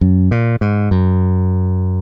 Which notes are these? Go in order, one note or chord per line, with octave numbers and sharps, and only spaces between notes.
F#2
A#2
G#2
F#2